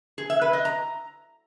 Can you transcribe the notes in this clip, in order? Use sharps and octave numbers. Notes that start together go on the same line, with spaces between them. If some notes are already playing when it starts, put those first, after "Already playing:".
G#4
E5
B4
D#5
A#5